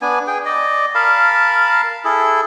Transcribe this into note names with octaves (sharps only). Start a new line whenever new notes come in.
B3 D4 G#5
G#4 G5
D5 D#5
A#4 F5 A5 B5
E4 G#4 A4